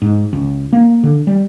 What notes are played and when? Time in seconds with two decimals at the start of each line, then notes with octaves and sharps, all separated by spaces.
0.02 G#2
0.33 C#2
0.73 A#3
1.04 D3
1.27 G3